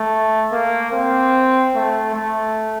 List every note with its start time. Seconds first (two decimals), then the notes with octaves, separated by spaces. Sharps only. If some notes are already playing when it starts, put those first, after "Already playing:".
Already playing: A3
0.52 A#3
0.94 C4
1.75 A3
2.15 A3